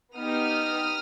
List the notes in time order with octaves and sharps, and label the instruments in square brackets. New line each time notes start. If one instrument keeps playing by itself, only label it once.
[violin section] B3 D#4 G4 D#6 F6